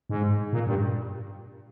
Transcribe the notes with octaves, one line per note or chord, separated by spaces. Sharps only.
G#2
A#2
G2